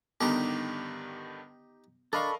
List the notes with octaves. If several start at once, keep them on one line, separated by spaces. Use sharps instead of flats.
G2 D3 D#3 B3 D#4 G4
D4 A4 A#4 D#5 F5 B5 C#6